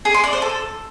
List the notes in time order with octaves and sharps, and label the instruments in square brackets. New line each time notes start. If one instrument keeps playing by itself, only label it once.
[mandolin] G#4
C6
D5
C5
A4